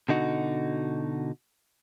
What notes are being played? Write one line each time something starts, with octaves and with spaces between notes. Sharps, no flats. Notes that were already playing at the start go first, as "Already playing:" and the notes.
B2 D3 D#4 F#4